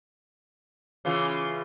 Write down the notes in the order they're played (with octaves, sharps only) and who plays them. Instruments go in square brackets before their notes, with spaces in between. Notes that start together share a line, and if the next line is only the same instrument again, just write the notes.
[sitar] C#3 E3 F4